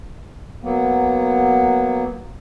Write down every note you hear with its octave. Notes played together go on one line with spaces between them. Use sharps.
F#3 A#3 B3